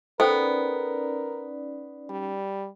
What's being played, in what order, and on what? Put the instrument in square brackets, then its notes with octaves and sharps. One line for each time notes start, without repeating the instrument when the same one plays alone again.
[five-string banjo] B3 [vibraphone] C#4 D#4 D5 [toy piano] A4 C5 G5 [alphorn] A#4
[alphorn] G3